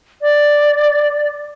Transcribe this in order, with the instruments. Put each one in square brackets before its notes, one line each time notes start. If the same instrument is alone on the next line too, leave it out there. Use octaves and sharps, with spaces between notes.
[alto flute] D5